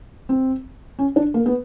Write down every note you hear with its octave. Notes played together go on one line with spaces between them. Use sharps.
C4
C#4
D4
A#3
B3